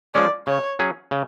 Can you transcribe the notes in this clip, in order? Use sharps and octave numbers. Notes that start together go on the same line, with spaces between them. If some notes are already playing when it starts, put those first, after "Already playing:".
F3 G#3 C#4 D5
C#3 C#5
F#3 C#4 G#4
C#3